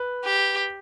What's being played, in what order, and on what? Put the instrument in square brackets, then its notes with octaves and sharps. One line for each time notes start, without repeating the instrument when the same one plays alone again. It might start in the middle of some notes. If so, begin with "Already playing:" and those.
Already playing: [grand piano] B4
[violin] G4